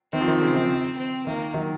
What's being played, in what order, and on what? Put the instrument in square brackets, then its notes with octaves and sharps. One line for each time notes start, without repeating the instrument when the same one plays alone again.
[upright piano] D#3 [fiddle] C4
[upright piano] F3
D#3
[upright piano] C#3 F3 [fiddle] C4
[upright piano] D#3
[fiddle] C4
[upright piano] D#3 [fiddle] A#3
[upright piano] D#3 F#3